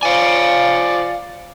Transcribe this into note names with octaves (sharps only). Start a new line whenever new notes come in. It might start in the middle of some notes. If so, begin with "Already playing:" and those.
F3 D5 F5 G#5